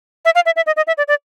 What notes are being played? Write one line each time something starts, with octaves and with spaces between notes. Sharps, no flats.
E5
F5
E5
E5
D#5
D#5
E5
D5
D5